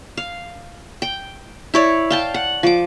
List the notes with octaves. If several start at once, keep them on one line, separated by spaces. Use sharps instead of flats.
F5
G5
E4 C#5 D5
F5 G5 A5
F#5
F3 D6